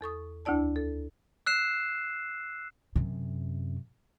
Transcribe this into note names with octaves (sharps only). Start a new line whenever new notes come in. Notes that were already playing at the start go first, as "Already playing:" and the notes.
E2 A4 C#6 D#6
D2 D4 E4 D5 A5
A4
E6 F#6 C7 E7
F#2 C3